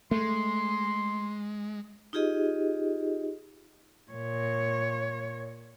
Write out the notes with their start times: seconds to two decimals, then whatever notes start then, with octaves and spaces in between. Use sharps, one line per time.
0.11 G#3 A3 C6
2.13 D#4 F4 G4 G#4 D#5
4.12 A#2 C#5